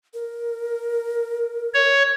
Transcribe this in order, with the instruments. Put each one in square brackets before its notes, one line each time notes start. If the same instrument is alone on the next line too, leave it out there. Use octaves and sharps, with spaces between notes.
[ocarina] A#4
[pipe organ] C#5